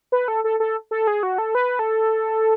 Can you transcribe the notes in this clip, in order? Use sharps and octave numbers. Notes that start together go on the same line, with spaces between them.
B4
A4
A4
A4
A4
G#4
F#4
A4
B4
A4